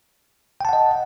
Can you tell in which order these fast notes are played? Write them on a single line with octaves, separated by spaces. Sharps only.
G5 A5 F#5 D#5